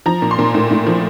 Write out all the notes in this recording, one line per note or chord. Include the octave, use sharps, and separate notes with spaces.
F3 A#5
A#2
C6
A#2
A2
A2
F3